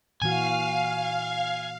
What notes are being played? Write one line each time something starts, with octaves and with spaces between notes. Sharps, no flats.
A#2 E3 F#4 F5 G#5